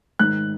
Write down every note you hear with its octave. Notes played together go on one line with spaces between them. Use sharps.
G#2 D#3 F#6